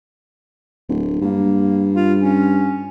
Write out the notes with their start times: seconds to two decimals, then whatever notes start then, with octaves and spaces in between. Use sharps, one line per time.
0.89 D1
1.21 G2 A#3
1.95 F4
2.20 C#4